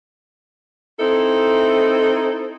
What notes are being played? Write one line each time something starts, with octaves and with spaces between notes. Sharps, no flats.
C4 D#4 E4 A4